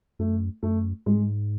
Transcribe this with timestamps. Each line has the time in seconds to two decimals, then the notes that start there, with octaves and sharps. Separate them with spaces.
0.19 F#2 A3
0.63 F#2 A3
1.06 G#2 G#3